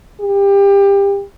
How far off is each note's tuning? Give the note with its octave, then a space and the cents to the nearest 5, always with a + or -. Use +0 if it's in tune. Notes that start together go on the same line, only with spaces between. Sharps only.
G4 +25